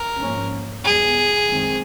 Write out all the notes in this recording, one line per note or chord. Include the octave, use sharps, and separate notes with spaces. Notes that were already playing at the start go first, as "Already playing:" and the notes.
Already playing: A#4
G#2 F3 A#3 C#4
E2 B2 G3 B3 G#4
F#2 D#3 G#3 C4